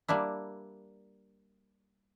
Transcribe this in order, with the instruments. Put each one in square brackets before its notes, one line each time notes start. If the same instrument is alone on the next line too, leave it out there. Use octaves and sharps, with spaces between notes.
[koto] G3 A#3 D4 E4